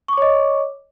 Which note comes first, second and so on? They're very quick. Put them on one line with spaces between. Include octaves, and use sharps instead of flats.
C#6 D6 C#5 D#5